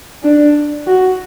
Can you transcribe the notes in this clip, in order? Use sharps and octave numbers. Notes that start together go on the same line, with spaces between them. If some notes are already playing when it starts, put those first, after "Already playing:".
D4
F#4